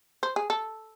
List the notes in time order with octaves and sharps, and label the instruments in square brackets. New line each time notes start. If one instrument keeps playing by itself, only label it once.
[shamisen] C5
G#4
A4